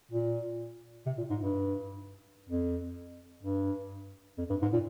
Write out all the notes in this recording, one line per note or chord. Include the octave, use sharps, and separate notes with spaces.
A#2
C3
A#2
G#2
G2
F2
G2
F2
G2
G#2
A#2